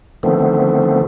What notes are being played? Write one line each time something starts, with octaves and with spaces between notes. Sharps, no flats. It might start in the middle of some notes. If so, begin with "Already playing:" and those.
D3 D#3 F3 A3 B3 C4